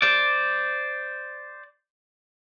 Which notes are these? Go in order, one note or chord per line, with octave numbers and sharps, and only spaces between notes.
C5 D5